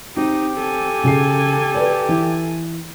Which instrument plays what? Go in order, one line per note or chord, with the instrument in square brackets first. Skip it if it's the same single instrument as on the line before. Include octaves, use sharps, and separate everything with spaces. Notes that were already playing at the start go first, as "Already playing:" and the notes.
[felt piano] C4 [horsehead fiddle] D#4 [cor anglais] G4
[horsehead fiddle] A4 G#5
[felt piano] C#3 G#4 C7
B4 D5
E3